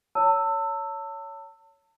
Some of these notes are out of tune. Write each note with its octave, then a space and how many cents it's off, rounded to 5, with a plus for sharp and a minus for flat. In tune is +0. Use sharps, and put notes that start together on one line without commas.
C#5 +15 A5 +40 E6 +0